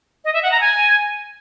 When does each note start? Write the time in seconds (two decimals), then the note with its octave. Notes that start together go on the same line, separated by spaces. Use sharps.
0.25 D#5
0.34 E5
0.43 F#5
0.52 A#5
0.61 G#5